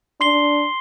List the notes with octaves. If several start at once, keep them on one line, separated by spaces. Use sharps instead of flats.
D4 C6 C7 G7